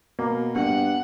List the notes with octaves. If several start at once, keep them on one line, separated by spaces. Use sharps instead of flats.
B2 A#3
G2 B3 F#5